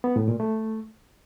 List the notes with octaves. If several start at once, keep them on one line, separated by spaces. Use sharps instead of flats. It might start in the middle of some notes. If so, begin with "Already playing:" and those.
B3
A2
A#2
A3